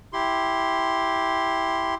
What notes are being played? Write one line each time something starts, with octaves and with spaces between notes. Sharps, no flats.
E4 G4 C6